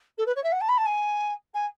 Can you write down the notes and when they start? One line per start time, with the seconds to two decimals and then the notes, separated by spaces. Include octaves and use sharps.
0.18 A4
0.26 B4
0.35 C#5
0.43 E5
0.52 F#5
0.61 A5
0.68 B5
0.77 A5
0.85 G#5
1.54 G#5